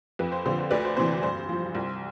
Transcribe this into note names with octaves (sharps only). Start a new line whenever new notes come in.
F2 B4
C5
D3 F3 C5
C5
D2 B4 D5
C5
C3 E3 C5
G2 C5
F3
C2